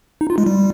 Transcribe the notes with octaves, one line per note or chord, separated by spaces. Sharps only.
D#4
F4
G#3
G3